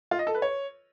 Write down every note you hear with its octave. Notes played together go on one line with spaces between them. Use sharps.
F4
D#5
A4
B4
C#5